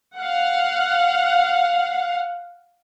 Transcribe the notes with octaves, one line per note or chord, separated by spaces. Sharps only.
F5 F#5